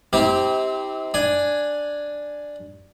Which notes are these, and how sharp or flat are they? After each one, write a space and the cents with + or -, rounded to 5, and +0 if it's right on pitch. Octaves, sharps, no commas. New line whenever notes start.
C4 -5 E4 -45 G4 +0
D4 +0 G#5 +0